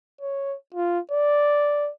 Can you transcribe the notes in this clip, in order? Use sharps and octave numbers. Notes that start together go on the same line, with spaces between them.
C#5
F4
D5